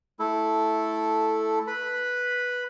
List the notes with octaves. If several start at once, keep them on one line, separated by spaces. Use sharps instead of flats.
A3 E4 A4
B4 B5